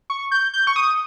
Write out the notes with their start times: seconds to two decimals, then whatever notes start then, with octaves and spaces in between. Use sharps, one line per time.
0.10 C#6
0.32 G6
0.54 G6
0.67 C#6
0.76 D#6